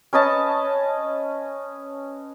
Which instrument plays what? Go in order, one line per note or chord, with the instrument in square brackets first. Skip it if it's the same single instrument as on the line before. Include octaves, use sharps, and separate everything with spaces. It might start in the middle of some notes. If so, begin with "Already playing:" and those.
[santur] C#4 B4 D#5 A5